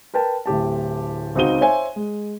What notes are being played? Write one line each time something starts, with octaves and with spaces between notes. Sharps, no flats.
A#4 B4 G5 A5
D1 A2 G4 A5
C#2 C4 D#4 F#4 D#7 G7
C5 C#5 E5 G#5
G#3